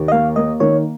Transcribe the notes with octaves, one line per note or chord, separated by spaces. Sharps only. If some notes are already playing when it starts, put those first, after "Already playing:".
Already playing: D#2
D#5
A#3 F5
A#3 D#5
D#3 C#5